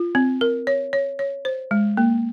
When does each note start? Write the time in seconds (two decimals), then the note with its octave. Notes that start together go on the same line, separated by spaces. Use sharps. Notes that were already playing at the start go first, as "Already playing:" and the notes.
Already playing: F4
0.15 C4
0.41 A#4
0.67 C#5
0.93 C#5
1.19 C#5
1.45 C5
1.71 G#3
1.97 A#3